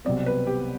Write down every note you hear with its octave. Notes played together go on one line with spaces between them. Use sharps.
C2 B2 F#3 C4 D5
B4
G4